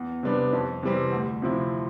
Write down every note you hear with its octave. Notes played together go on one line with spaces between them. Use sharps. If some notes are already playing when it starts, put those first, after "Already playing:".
Already playing: E2
C3 G3 B3 D4
F2
C3 E3 G3 C4
D2
C3 F3 C4 E4